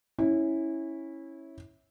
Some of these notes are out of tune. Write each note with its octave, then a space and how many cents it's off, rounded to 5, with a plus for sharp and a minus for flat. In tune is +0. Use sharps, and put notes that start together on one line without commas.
C#4 -15 E4 -15